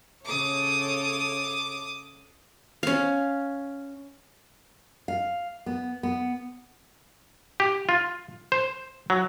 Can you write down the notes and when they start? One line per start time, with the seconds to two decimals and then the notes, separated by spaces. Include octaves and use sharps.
0.25 C#3 A4 C#5 D6 D#6
2.83 C#4 F5
5.08 F5
5.66 B3
6.03 B3
7.60 G4
7.89 F4
8.52 C5
9.10 F#3